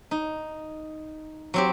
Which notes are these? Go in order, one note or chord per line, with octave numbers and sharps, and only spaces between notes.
D#4
F#3 C4 G4